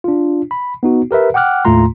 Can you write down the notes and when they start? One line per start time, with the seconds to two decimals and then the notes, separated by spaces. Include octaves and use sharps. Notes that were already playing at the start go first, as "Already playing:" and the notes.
0.04 D4 F4
0.51 B5
0.83 B3 D#4 F#4
1.11 G4 A#4 B4 E5
1.34 F#5 G5 D6 F6 F#6
1.65 D#2 A2 A3 F4 A#5 C6